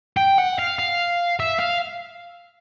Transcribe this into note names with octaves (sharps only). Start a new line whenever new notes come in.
G5
F#5
F5
F5
E5
F5